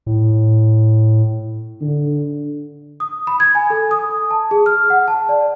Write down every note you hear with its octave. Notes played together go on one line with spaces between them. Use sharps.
A2
D3
D#6
B5
G#6
G#5
A4
D#6
A5
G#4
F6
F#5
A5
D5